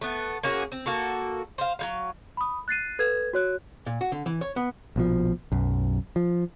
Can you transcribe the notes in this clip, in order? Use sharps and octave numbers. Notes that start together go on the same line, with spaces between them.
A3 B3
A#3 C#4 F#4 G#4
C4
A#3 F#4 A4
C5 F5
F#3 G3 F5
B5 D#6
F#6 A6 C7 D#7
A4 B4 G#6
F#4 C#5 F#6
A#2
F#4
D3
E3
C#5
B3
A#1 B2 F3
B1 F#2
F3